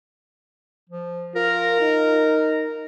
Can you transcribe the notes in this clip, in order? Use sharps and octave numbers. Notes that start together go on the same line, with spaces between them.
F3
F4 A#4
D#4